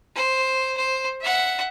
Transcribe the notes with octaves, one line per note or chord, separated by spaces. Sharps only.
C5
C5
E5 F#5